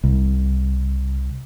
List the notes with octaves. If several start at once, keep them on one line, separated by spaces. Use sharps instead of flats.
C2